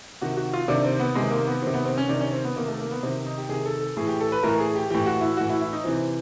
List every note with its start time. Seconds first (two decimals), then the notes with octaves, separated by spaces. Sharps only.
0.21 C3 D#3 F#4
0.37 F#4
0.54 F4
0.68 C3 D#3 D4
0.84 C4
0.99 B3
1.15 C3 D#3 G#3
1.30 A#3
1.47 B3
1.62 C3 D#3 C4
1.74 B3
1.85 C4
1.98 C#4
2.09 C3 D#3 D4
2.21 C#4
2.32 C4
2.44 B3
2.56 C3 D#3 A#3
2.68 A3
2.79 A#3
2.91 B3
3.03 C3 D#3 C4
3.26 D#4
3.38 G4
3.49 C3 D#3 G#4
3.66 A4
3.80 A4
3.97 A2 E3 G#4
4.08 G4
4.21 A4
4.32 B4
4.43 A2 E3 A#4
4.59 G#4
4.75 G4
4.90 A2 E3 G4
5.06 F#4
5.21 E4
5.37 A2 E3 F#4
5.49 E4
5.61 E4
5.73 D#4
5.84 C3 E3 C4